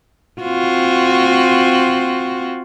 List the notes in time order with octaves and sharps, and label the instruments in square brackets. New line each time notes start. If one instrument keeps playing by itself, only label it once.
[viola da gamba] C4 F4 F#4